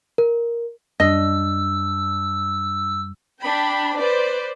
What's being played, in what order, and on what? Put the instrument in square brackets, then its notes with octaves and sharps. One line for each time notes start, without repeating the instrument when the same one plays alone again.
[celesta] A#4
[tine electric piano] F#2 G3 [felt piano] D4 [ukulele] D#5 [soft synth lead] E6
[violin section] D4 G5 B5
B4 C5 D5